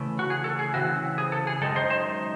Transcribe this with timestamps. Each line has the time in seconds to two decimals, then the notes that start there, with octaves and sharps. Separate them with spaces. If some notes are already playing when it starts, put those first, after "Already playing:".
Already playing: C#3 E3 A3
0.19 F#4
0.30 G#4
0.44 A4
0.59 G#4
0.74 C#3 E3 C4 E4 F#4
1.18 G#4
1.32 A4
1.47 G#4
1.61 F#2 D#3 G#3 D#4 A4
1.76 C5
1.90 C5